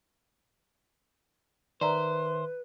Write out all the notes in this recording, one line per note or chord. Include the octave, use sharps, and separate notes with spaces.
D#3 B4 C5 D5 E5 A#5